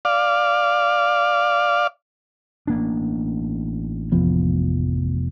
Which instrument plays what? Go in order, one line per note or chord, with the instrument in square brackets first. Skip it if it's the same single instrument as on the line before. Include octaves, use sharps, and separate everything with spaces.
[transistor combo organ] D5 F5
[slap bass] A1 A#3 D4
[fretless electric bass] F1 F3 B3